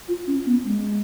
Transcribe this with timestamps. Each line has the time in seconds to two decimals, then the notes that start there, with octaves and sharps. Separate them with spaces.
0.08 F4
0.27 C#4
0.46 B3
0.64 G#3